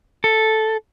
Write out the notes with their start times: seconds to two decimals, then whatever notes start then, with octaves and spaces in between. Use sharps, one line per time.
0.24 A4